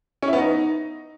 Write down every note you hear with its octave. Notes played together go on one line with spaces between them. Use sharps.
C#4
E4
B3
D#4